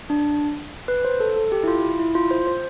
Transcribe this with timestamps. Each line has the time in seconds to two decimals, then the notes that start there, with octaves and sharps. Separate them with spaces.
0.10 D4
0.88 B4
1.05 C5
1.20 A4
1.36 A4
1.52 G4
1.64 E4
1.68 F4
1.99 E4
2.15 F4
2.31 C5
2.47 C5